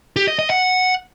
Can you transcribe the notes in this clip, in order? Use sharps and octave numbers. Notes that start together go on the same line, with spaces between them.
G4
D#5
D#5
F#5